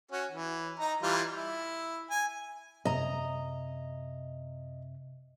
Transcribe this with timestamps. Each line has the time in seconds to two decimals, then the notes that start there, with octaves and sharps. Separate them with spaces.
0.11 C#4 F#4
0.32 E3
0.80 D#4 A#5
1.03 E3 G3 F4
1.37 E4
2.10 G#5
2.85 F#2 C3 D#5 E5 A#5